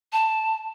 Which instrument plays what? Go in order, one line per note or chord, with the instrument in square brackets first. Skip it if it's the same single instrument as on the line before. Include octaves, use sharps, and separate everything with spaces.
[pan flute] A5